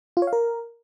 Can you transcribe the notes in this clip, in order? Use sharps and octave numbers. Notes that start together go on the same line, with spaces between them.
F4
C#5
F5
A#4